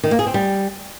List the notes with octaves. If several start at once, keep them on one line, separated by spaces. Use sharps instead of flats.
D#3
A#3
G#4
C4
G3